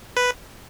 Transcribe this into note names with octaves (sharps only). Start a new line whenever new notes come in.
B4